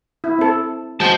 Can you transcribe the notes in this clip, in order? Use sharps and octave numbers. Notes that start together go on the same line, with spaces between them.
E4
C4 A4
G#3 F#4 C5 A5